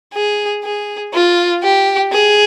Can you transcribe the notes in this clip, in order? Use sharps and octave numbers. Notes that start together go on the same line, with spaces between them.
G#4
G#4
F4
G4
G#4